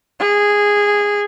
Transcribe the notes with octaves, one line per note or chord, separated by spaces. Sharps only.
G#4